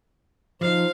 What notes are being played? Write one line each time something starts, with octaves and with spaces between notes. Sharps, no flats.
F3 D#4 C5 F5